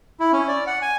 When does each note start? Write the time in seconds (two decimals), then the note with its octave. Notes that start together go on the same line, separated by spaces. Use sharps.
0.20 E4
0.32 C#4
0.48 D5
0.67 F#5
0.82 G#5